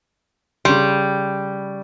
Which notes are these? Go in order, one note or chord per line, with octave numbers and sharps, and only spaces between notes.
C#3 G3 C6